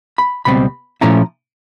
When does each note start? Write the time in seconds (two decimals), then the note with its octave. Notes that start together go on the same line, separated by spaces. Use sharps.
0.18 B5
0.45 C#2 B2 G3 C4 B5
1.01 A#2 F3 A3 C#4 E4 A#5